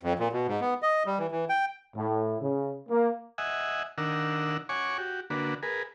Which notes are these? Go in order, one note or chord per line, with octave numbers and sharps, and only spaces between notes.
F2
A#2
B2
G#2
B3
D#5
G3
E3
E3
G5
A2
C#3
A#3
D#5 E5 F#5 G#5
D#3 D4 A#4 F#5 E6
C#5 F#5 G#5 C#6 D6
F#4 G4
D3 A#3 D4 F#4 B4
G#4 A#4 B4